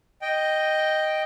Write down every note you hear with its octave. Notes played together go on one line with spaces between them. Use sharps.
D#5 G5